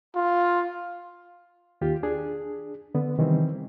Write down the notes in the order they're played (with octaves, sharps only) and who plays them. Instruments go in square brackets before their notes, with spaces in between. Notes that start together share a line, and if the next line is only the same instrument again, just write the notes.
[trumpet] F4
[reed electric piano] D#2 F4 G4
D4 G#4
D3 B3
C3 D#3 E3 G3 C4